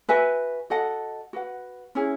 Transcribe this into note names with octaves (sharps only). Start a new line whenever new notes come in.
F#4 B4 E5 G#5
F#4 A4 D#5 F#5
F#4 B4 F#5
C#4 E4 G#4